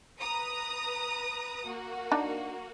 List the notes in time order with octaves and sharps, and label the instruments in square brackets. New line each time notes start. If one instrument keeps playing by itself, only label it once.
[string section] B4 A#5 D#6
A#3 F#4
[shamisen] D4 D#4